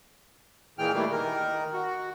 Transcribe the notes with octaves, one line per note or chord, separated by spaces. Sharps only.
A#2 E3 G#3 G5 F6
D#3 E3 G3 A3 A#3
D#3 A#4
F#4